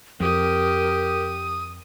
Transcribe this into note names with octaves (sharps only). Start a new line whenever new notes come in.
F2 G4 A#4 D#6